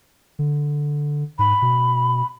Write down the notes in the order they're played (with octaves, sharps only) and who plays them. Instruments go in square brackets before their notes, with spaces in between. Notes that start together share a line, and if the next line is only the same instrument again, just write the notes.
[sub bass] D3
[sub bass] G#2 [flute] B5
[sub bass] B2